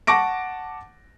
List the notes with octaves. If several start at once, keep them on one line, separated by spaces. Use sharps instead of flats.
F#5 A5 C#6 D6 A#6 D7